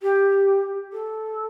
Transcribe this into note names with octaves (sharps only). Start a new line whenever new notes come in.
G4
A4